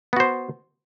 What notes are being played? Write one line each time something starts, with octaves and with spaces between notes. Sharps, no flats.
B3 F#4 C5